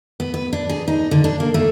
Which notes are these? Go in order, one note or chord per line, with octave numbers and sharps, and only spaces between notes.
B3
B4
D4
G#4
D#4
D3
D4
A#3
A3